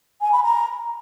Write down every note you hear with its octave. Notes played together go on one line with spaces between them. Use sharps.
G#5
B5
A#5